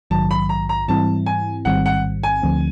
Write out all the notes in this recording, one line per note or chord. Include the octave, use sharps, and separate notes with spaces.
A#1 G#2 D#3 F#3 A5
B5
A#5
A#5
G#2 E3 G3 C4 E4 A5
G#5
A1 G#2 D#3 G3 C4 F#5
F#5
G#5
D2 D3 F3 A3 C4